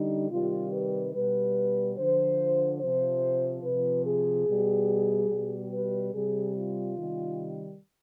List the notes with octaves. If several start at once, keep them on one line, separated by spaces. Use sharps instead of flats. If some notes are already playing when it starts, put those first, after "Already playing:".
Already playing: D3 G3 D#4
C3 D#3 G3 F4
B4
B2 G3 B4
D3 F3 C5
C3 F3 C5
C3 F3 B4
G#4
B2 G3
B2 G3
B4
C3 G3 G#4
F4
C3 D#3 G3